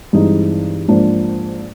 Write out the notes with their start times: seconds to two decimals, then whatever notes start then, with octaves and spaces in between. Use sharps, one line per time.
0.13 G2 E3 G#3 C4 D#4
0.88 G#2 F3 A#3 D4